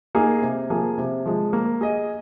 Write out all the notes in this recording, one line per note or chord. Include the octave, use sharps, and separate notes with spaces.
A#3 D#4 G#4
C3
F3 A#3 G#4
C3
F3 G#3
A#3
G#4 D#5